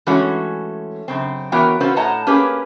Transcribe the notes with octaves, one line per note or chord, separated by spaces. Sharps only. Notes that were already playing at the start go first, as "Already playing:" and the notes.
E3 G#3 A3 C#4 F#4 C#5
F#2 C#3 C4
E3 B3 F#4 A#4 C#5 G5
C4 C#4 F4 F#4 B4 C5
A2 C#5 D#5 F#5 A5 A#5
A#3 C#4 G4 G#4 B4